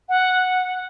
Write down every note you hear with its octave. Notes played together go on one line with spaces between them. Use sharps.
F#5